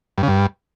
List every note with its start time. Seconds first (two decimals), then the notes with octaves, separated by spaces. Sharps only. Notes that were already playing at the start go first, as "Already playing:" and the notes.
0.18 G2
0.23 C#3
0.28 G2